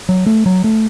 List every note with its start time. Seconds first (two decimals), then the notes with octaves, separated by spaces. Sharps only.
0.09 F#3
0.26 A3
0.46 F#3
0.64 A3